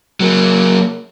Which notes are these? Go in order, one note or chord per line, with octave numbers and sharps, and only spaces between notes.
F#3 A#3